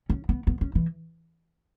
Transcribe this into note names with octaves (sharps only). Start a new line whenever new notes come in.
C#4
B3
B3
C#4
E3